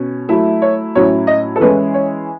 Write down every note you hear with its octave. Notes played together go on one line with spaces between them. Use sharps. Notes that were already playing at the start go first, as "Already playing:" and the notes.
Already playing: B2 C#4
F#3 A3 E4 E5
C#5
A2 F#3 C#4 E4 C#5
D#5
A4
E3 G#3 C#4 E4 B4
C#5